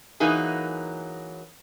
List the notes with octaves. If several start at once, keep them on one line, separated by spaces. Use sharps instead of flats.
E3 F#3 A#3 D#4 G#4